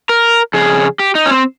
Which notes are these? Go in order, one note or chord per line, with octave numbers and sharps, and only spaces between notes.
A#4
F2 C#3 G#4
G4
D#4
C#4
C4